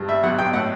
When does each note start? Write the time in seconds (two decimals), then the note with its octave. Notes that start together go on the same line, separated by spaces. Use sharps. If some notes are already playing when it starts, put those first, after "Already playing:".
Already playing: G2
0.08 G3 E5
0.23 B1 F#5
0.38 B1 G5
0.53 A2 F#5